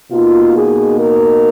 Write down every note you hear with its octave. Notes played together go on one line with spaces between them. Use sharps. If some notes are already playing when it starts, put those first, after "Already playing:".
B2 A#3 D#4 F4
G#4
A#4